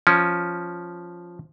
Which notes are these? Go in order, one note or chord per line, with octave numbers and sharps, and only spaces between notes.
F3 C#4